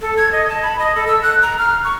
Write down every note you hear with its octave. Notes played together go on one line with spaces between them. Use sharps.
A4
G#6
D#5
A5
B5
D#5
A4
E6
F#6
A#5
F6
C#6